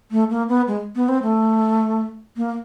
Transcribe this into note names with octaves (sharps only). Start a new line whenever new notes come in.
A3
A#3
B3
G#3
B3
C4
A3
A#3